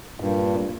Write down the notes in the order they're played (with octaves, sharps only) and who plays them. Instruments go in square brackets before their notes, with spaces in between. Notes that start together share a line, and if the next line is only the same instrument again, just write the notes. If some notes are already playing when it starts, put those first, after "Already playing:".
[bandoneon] G2 [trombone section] A#2